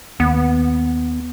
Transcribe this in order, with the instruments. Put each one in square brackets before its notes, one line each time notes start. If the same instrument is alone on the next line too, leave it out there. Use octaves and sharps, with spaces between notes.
[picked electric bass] D#2 [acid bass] B3